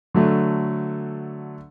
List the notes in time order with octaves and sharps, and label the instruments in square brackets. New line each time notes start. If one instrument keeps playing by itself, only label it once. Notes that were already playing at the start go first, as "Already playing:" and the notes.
[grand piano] D3 F#3 A3